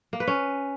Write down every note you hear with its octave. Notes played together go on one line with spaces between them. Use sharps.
A#3
B4
C#4